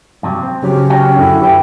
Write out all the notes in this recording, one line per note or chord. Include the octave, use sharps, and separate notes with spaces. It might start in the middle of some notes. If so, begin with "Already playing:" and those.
G2 C3 F#3
C4
C#3 F#3 C#4 G4
F#4 C#5 G5
F#2 D3 E4
G4 B4 G5